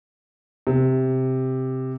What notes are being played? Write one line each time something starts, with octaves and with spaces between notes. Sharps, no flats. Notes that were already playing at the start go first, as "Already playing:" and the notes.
C3